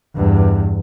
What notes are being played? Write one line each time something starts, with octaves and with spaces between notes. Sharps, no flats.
E2 G2